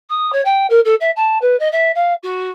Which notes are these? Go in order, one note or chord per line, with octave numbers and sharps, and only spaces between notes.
D#6
C#5
G5
A#4
A4
E5
A5
B4
D#5
E5
F5
F#4